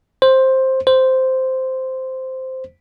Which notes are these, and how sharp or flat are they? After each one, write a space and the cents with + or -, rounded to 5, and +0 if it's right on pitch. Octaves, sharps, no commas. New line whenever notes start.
C5 +10
C5 -5